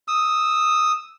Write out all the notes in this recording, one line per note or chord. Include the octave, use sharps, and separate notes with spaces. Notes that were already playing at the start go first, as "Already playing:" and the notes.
D#6 E6